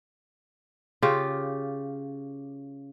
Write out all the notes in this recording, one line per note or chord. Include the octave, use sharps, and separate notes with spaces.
C#3 F4 G4